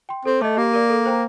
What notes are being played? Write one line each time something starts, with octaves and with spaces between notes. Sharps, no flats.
G5 C6
C4 A4
A3 D#5 A5 D6
A#3 G4
A#4 D5
A4
C5 G5 A#5